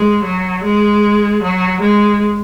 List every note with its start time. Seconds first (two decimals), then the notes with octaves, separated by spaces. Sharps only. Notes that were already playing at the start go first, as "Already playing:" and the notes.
Already playing: G#3
0.24 F#3
0.64 G#3
1.42 F#3
1.81 G#3